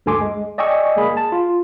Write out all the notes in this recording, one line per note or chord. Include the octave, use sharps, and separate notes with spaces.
D2 G2 A4 G#5 C6 D6
G#3
D5 D#5 G5 G#5 C#6 E6
G1 G#3 A#3 G#4 B5
A5
F4